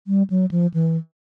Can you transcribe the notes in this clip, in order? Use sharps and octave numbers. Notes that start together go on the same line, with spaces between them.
G3
F#3
F3
E3